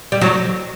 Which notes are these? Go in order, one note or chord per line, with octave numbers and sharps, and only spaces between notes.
G3
F#3